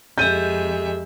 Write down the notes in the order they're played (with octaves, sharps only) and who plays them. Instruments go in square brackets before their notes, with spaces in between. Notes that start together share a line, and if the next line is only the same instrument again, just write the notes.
[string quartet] F2 G#3 E5 [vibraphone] G4 A4 [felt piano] G6 D#7